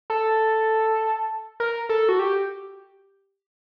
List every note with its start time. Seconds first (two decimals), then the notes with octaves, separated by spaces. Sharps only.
0.10 A4
1.60 A#4
1.89 A4
2.09 F#4
2.19 G4